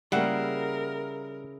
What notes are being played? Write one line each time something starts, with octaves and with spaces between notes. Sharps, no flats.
C#3 G3 A#3 E4 A#4 F#5